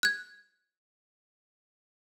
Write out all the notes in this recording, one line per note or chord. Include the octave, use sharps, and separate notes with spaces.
F#6 G#6